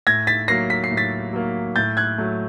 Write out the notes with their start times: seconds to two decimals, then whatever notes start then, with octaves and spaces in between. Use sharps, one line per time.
0.07 A2 G#6 A#6
0.27 A6 B6
0.48 F#3 A#3 A#6 C7
0.70 B6
0.84 C7
0.91 A2
0.97 A6 B6
1.33 F#3 A#3
1.76 A2 G6 A6
1.97 F#6 G#6
2.18 F#3 A3